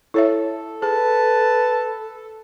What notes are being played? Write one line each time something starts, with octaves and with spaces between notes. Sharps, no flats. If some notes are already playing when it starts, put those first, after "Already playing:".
E4 A4 C#5 E5
G#4 B4 A5